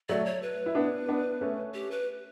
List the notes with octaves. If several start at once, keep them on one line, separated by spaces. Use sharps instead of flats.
F#3 A3 D5
C#5
B4
E4
B3 D4
B3 D4
A3 C#4
G4
B4